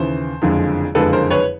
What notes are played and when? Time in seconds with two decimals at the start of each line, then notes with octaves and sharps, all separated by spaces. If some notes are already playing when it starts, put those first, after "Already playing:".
Already playing: D#2 C#3 E3 C5
0.42 F#1 F2 D3 F3 G#3
0.95 F#1 F2 D3 F3 G#3 A4 B4
1.13 A#4 C5
1.30 B4 C#5